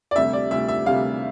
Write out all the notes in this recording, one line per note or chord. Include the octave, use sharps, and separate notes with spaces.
D5
D2 C3 G3 E5
D5
D2 C3 G3 E5
E5
D2 C3 G3 F5